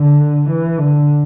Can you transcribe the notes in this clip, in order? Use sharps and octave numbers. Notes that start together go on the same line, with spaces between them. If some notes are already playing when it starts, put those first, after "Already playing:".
Already playing: D3
E3
D3